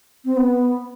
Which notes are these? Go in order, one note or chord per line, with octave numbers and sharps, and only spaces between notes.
C4
B3